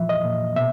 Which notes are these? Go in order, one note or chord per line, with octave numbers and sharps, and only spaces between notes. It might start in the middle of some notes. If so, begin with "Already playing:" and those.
Already playing: A#2 E3 F3 E5
D#5
A#2
B2 E5